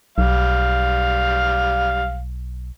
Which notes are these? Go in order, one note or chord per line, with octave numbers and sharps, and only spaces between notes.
B1 G3 F5